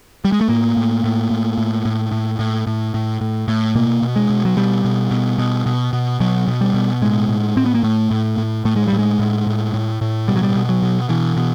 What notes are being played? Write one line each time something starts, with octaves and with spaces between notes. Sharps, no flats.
G3
G#3
A3
A2 A#3
A2
A2
A2
A2
A2
A2
A2
A2
A2
A2
A2
B2 A#3
B2
G#3
B2
F#3
B2 G3
B2
B2
B2
B2
B2
B2 F#3
B2
G3
B2
A2 G#3
A2
A2 C4
B3
A#3
A2 A3
A2
A2
A2 A3
G#3
A2 G3
G#3
A2
A2
A2
A2
B2 G3
F#3
G3
B2
F#3
B2
B2 E3
B2